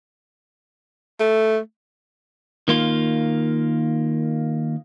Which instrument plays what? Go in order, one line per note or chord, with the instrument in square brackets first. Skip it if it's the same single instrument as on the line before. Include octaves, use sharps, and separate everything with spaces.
[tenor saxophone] A3
[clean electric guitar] D#3 A#3 F4